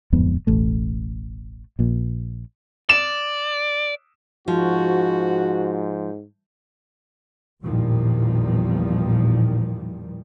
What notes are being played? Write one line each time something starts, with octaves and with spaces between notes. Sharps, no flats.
D1 F2 G#2 B3
E1 A1 A3
A#1 A#2
D5 E7
G#2 F3 F#4
A1 E2 A#2 D#3 F3 G3